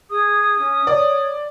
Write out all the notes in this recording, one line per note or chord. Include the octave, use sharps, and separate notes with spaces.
G#4 D#6
C#4
C#5 D5